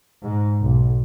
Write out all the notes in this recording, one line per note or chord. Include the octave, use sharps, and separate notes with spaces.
G#2
B1